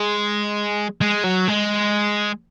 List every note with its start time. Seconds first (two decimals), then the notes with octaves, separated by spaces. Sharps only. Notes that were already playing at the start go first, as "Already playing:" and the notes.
Already playing: G#3
1.01 G#3
1.24 F#3
1.48 G#3